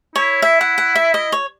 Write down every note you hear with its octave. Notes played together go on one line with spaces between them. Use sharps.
E4 C#5
E4 E5
F#5
F#5
E5
D#5
C#5